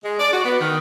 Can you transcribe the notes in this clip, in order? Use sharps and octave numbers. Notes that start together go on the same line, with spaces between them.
G#3
D5
F#4
B3
D#3